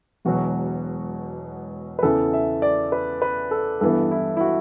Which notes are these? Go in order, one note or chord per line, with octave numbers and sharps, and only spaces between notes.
E1 E2 B2 F#3 F#4
B4
E2 C#3 E3 A4
E5
D5
B4
B4
A4
G2 E3 B3 A4
E4
E4
F#4